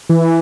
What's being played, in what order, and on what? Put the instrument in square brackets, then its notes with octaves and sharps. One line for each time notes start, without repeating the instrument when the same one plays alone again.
[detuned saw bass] E3